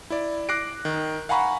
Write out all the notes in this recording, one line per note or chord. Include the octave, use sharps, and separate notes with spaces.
E4 D5
D6 F#6 A#6 C7 D7
D#3
F5 F#5 G#5 A#5 B5 C#6